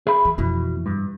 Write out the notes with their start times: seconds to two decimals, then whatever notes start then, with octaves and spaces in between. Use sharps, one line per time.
0.07 G#4 E5 B5
0.25 E3
0.38 F2 B2 E3
0.86 G2